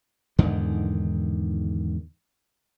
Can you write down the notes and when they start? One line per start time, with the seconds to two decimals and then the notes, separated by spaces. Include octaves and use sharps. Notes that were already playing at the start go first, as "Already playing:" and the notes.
0.39 E2 G#2 D3 D#3